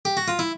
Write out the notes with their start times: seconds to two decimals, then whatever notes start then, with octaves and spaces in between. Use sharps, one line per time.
0.05 G4
0.17 F#4
0.28 F4
0.39 E4